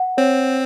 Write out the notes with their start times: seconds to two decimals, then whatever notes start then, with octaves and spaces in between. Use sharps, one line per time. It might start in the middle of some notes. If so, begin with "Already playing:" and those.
Already playing: F#5
0.17 C4 C#5